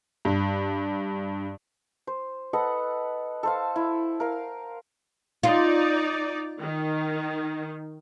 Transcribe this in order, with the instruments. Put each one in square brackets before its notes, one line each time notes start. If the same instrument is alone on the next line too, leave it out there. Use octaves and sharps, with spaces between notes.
[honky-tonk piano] G2
[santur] C5
A4 B4 D#5 F#5
A4 C5 F5
E4
A#4 F5
[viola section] D#4 D5 [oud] F4
[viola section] D#3